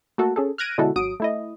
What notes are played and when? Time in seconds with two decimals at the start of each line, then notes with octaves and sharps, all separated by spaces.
0.18 A3 A#3 F#4 A4
0.36 C#4 G#4 A4
0.58 F6 F#6 G#6 A#6 D7 D#7
0.78 B2 D3 G#3 E4 F#4 A4
0.96 G#1 F#3 D#6 D7
1.20 A3 E4 D#5